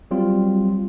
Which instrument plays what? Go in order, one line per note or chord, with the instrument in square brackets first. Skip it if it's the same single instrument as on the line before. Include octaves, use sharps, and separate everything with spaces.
[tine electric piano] F#3 G3 C4 F4